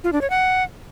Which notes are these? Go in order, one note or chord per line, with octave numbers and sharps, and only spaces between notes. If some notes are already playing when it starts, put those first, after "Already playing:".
F4
D4
C#5
F#5